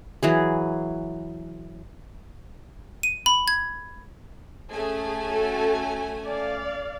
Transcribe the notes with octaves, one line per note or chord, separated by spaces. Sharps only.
E3 F#3 G#4
D#7
B5
G#6
A3 C#4 G#4 G#5
F#4 A4
D5 F5